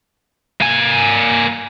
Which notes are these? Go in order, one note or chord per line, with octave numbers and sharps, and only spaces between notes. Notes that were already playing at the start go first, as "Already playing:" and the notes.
A#3 G#5